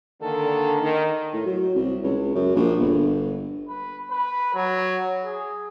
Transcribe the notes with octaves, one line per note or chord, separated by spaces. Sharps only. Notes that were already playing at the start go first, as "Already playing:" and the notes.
D3 D#3 A#3 D4 A4
D#3
A2
F#3
C2
C#2
F#2
A#1
G1
B4
B4
F#3
G#4